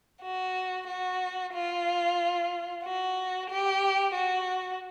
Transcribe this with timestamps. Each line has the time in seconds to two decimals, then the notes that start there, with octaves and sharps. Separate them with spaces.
0.22 F#4
0.87 F#4
1.54 F4
2.84 F#4
3.50 G4
4.15 F#4